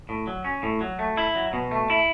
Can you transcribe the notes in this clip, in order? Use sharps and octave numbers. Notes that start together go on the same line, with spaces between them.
A2
F#3
C#4
A2
F#3
A3
E4
F#3
B2
A3
E4